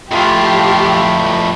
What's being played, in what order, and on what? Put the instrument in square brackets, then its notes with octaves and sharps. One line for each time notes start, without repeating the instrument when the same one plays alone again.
[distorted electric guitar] F2 E3 [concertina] A3 B5 [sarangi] F4 [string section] G4